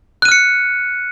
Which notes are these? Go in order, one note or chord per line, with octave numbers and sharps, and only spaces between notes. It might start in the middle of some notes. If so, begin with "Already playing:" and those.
F6 F#6 C#7 D#7